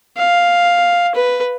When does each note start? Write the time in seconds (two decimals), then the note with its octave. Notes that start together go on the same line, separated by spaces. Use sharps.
0.17 F5
1.15 B4